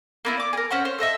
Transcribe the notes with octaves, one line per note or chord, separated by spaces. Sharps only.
A#3 B3 E4
D5 D6
G#4 A#4
C#4 C5 F#5 C#6
C5 C#5
A4 C5 D#5 E5